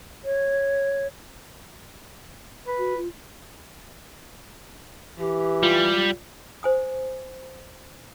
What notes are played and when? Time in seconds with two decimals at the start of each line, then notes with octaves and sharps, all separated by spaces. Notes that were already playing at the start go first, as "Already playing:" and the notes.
0.24 C#5
2.67 B4
2.78 F#4
2.97 F4
5.19 E3 G4
5.63 G3 F4
6.63 C5 G#5 D#6